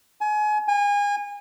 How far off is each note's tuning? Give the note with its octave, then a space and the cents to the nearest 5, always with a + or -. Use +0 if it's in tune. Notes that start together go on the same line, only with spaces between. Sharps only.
G#5 +30
G#5 -30